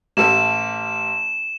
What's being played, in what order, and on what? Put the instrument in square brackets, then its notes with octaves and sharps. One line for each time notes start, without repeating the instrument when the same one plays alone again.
[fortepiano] A1 A4 E5 [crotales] E7